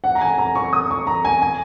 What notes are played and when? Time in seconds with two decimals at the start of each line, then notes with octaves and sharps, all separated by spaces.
0.04 F#5
0.15 A#5
0.21 G#5
0.38 A#5
0.55 C#6
0.73 D#6
0.91 C#6
1.07 A#5
1.25 G#5
1.42 G#5